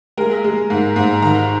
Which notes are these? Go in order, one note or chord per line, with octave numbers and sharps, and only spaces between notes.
G#3 A#4
G#3
G#2
G#2
D#3 A#5